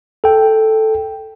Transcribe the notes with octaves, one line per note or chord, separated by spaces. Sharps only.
A4 G5